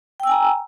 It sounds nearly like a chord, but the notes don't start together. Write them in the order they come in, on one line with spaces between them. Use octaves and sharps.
G5 E6 G#5 A#5